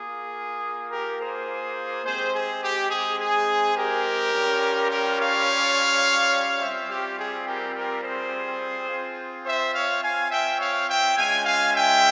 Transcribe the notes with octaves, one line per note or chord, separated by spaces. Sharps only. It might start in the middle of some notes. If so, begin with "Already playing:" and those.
Already playing: A#3 F4 G#4
G4 A#4
G#4 C5
G#3 C4 G4 G#4 C5
G#4
G4
G#4
G#4
G4 A#4
G3 C#4 F4
G4 A#4
C#5 F5
G3 C4 F4 C5 E5
G4
G#4
G4 A#4
G4 A#4
G#4 C5
C4 F4
C5 E5
C#5 F5
F5 G#5
E5 G5
C#5 F5
E5 G5
G#3 C#4 F4 F5 G#5
F5 G#5
E5 G5